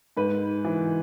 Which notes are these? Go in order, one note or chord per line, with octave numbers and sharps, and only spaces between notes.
G#2 B4
E3